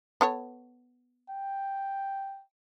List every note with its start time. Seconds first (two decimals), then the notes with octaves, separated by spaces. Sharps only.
0.21 B3 A4 C#5
1.30 G5